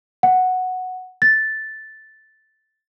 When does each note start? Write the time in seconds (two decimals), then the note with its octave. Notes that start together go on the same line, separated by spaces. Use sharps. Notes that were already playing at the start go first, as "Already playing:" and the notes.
0.23 F#5
1.22 A6